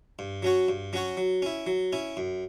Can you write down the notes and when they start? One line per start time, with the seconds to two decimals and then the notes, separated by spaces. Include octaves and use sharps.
0.19 G2
0.43 F#3 C#4 F#4 C#5
0.69 G2
0.93 F#3 C#4 F#4 C#5
1.17 F#3
1.42 C#4 E4
1.67 F#3
1.93 C#4 E4
2.17 F#2